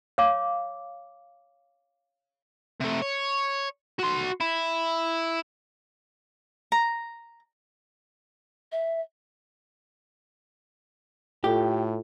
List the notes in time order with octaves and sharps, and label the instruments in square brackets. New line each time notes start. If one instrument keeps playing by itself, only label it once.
[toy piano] C#5 F5 D6
[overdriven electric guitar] C3 A3
C#5
F#4 C6
E4
[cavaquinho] A#5
[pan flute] E5
[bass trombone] A2 [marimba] F4 A4 [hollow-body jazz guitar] G4